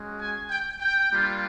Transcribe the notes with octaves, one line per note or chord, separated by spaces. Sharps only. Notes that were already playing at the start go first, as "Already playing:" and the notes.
Already playing: G#3 C#4 F#4
G#5
G5
G5
G3 A#3 D4 F4